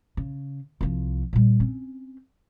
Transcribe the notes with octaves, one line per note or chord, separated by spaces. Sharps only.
C#3
C2 F3
A#2 G3
C4 C#4